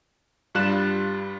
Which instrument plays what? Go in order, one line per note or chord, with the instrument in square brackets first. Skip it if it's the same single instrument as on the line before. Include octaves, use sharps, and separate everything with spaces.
[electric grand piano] G2 G3 F4 F#6 E7